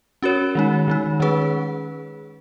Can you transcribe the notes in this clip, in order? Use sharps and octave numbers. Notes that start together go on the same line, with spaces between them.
C#4 F#4 A#4 C#5
D#3 G#3 D#4
D#3 G#3 D#4
D#3 G#3 C#4 G#4 B4